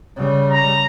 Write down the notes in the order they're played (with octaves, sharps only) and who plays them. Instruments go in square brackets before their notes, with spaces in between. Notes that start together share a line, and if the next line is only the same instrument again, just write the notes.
[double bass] C#3 G3
[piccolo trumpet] A#5